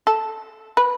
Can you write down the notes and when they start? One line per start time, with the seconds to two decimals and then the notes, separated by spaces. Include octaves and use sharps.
0.07 A4
0.77 B4